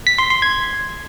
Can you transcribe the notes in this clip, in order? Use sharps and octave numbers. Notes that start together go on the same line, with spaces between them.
B6
C6
C6
G#6